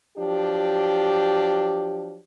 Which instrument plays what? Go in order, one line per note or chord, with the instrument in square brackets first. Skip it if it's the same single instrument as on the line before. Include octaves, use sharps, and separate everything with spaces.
[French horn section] F3 F#3 D4 G4